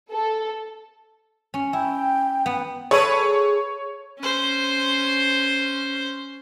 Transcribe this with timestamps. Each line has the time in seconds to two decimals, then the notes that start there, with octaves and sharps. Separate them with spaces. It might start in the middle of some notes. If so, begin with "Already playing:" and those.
0.12 A4
1.54 C#4
1.73 E4 G5
2.46 B3
2.91 G#4 A4 B4 C#5
4.19 C#4 C5